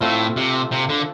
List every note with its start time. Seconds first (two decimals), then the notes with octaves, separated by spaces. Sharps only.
0.01 A2 A3 C4 F4
0.36 C3
0.71 C3
0.89 D3